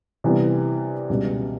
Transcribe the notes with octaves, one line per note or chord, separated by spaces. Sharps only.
C3 E3 G3 B3
C#2 B2 G3